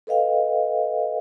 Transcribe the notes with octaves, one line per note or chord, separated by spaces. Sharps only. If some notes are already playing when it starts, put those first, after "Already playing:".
A4 B4 D#5 F5 G5